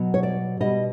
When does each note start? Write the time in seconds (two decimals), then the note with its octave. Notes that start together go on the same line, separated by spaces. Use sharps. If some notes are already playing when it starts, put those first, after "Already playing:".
Already playing: B2 F#3
0.14 C#5
0.23 D5
0.60 B2 G3 D#5